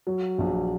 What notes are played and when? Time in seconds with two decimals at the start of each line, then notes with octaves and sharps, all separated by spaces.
0.07 F#3
0.38 A#1